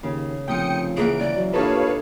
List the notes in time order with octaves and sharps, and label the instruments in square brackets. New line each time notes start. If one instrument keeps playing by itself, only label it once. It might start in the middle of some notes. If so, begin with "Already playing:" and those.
[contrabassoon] D#2 [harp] C#3
[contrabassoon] F1 [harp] A#2 F3 [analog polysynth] G5 D#6 C#7
[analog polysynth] C#2 D7 [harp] E3 A#3 F#5 [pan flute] G#4
[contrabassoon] D#1 [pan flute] D5
[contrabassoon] F#3
[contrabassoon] A#2 [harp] D4 D#4 A4 [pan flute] G4 [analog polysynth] B4 C#5 F5